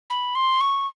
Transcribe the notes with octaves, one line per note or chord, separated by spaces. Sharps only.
B5
C6
C#6